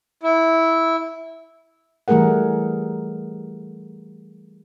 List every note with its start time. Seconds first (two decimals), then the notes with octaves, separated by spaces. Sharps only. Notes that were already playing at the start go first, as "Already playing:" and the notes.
0.23 E4
2.08 E3 G3 A3 G#4 A#4 F#5